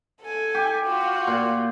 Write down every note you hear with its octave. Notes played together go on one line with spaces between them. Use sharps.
A4 G#5
G4
F4 F#4
A#2 C6